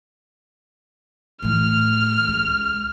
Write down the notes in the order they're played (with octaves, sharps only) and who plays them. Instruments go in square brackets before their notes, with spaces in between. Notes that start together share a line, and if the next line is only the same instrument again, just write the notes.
[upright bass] A2 E3 [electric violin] F6
[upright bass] C#2